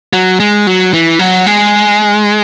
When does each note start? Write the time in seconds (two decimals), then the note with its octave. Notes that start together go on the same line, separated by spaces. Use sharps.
0.13 F#3
0.40 G#3
0.67 F#3
0.93 E3
1.19 F#3
1.46 G#3